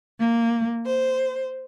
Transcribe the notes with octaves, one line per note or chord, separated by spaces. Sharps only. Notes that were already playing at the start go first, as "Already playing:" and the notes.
A#3
C5